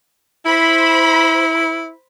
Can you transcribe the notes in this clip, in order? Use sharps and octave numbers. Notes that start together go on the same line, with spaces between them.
E4 C5 B5